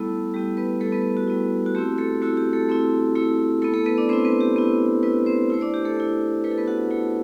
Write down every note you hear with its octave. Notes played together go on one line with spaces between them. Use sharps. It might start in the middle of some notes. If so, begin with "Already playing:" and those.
Already playing: G3 A3 B3 E4 A4
G3 B3 E4 G4
B3 B4
G3 A3 B3 E4 A4
B3 B4
F#4
G3 B3 E4
F#4
A3 C4 E4 G4
A3 A4
A3 C4 E4 F#4
G4
A3 A4
A3 C4 E4
A3 C4 E4
A3 B3 E4 A4
A3 A4
B3 B4
D4 D5
B3 C4 E4 C5
B3 B4
G4
B3 E4
B3 E4 B4
C4 C5
A3 E4 C5
D4 D5
G4
A3 A4
A3 E4
A3 E4 B4
A4
B3 B4
F#4 F#5
A3 E4